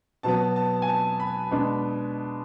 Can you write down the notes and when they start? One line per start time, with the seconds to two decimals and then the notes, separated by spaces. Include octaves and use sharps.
0.23 B2 F#3 B3 A5
0.56 A5
0.82 G#5
0.88 A5
1.20 B5
1.51 B2 G#3 D4